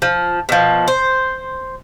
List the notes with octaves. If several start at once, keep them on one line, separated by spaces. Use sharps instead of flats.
F3
B2 F3
C5